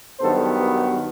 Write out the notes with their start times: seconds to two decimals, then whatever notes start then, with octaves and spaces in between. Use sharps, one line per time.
0.20 G2 D#3 F#3 B3 A4 C5
0.58 G4 B4